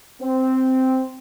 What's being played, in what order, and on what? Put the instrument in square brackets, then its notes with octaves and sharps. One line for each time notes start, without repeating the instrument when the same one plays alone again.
[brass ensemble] C4